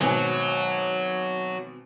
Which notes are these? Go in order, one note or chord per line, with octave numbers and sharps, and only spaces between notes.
G#1 B2 F#3 G#5